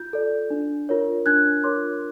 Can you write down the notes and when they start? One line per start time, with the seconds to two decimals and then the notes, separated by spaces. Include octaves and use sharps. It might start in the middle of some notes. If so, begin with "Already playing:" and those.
Already playing: F4 G6
0.13 A4 D5
0.50 D4
0.89 F4 A#4 C#5
1.26 D4 F#6 G#6
1.64 F4 A#4 C#5 C6 D6